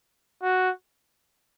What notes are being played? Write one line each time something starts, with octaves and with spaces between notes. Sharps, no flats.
F#4